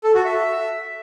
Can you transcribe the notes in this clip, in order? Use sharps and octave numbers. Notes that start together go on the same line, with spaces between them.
A4
F#4
E5